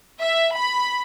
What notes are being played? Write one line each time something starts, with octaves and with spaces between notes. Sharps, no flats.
E5
B5